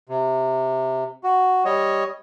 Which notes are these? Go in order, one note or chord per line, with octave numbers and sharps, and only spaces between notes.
C3
F#4
G3 C#5 D#5